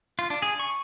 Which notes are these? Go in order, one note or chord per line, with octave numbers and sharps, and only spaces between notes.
F4
D4
G#4
C#6